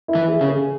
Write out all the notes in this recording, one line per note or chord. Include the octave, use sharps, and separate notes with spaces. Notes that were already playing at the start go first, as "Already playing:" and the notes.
E4
E3
G#4
C#3
G#4